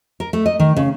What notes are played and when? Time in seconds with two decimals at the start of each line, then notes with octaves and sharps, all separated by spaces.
0.20 A#4
0.33 A3
0.46 D#5
0.60 D#3
0.77 C#3